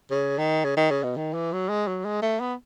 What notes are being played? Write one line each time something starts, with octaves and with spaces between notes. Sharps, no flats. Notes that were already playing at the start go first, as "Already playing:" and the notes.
C#3
D#3
C#3
D#3
C#3
B2
D#3
E3
F#3
G#3
F#3
G#3
A3
B3